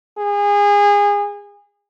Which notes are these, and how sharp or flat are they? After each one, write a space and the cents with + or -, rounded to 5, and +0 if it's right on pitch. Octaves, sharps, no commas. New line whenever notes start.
G#4 -25